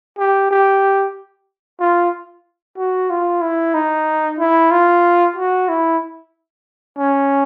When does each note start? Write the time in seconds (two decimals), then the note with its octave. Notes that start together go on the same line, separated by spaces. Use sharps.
0.18 G4
0.51 G4
1.80 F4
2.78 F#4
3.10 F4
3.42 E4
3.74 D#4
4.39 E4
4.71 F4
5.36 F#4
5.69 E4
6.98 C#4